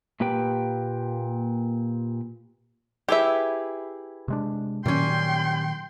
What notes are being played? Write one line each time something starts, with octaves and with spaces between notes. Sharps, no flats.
A#2 A#3 G4 B4 G5
E4 G4 G#4 B4 E5
C3 G#3 D4
A#2 D#3 F#3 G3 C#4 G5 C6